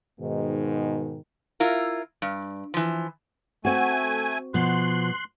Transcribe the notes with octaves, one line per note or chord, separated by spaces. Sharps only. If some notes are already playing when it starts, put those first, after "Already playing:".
G#2 B2 D#3
E4 F4 A#4
G2
E3 F3
A3 C4 F#4 G#5
B2 F3 C6 F#6